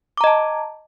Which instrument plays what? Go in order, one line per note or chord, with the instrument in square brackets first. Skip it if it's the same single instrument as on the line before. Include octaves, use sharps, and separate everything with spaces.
[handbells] D6
A#5
D#5
A5